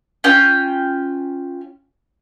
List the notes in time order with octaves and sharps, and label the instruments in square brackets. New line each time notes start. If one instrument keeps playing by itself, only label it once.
[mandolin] C#4 F4 G5